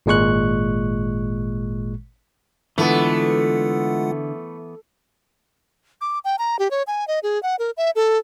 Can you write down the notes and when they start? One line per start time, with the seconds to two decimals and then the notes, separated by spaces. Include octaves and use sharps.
0.06 G#1 A#2 G#3 C#6 F#6
2.78 D3 E3 G#3 A3 B3 F4 F#5
6.01 D6
6.25 G5
6.39 A#5
6.59 G4
6.71 C#5
6.87 G#5
7.08 D#5
7.23 G#4
7.43 F#5
7.59 A#4
7.77 E5
7.96 A4